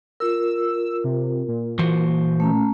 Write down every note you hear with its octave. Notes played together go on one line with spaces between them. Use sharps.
F4 A#4 E6
C3
A#2
E3 F#4 C5
A3 C#4 A#5